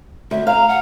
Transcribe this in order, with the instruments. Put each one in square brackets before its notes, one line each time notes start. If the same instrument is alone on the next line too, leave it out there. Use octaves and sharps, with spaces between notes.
[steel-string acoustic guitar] D2 [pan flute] E5
[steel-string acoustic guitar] F5 [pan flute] A#5
[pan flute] F#5